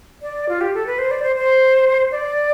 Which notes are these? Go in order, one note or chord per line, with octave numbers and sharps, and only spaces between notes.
D5
F4
G4
A4
B4
C5
D5
C5
C5
D5